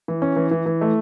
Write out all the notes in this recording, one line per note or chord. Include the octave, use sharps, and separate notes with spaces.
E3
C#4
E3
E3
E3
A3